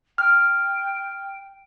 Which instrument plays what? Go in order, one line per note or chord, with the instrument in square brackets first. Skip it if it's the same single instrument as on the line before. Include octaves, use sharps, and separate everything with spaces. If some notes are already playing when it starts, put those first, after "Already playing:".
[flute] G5 [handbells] F6